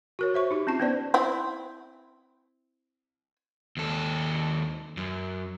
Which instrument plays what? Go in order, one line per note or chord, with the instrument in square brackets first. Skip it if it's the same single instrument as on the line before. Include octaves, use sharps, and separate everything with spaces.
[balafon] F#4 A#4 C#5
C5 E5 C#6
D#4 G4
C4 C#4 F4 A5
B3 C#4 B4 C5 D5
[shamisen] C4 E4
[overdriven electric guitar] D#2 A4
F#2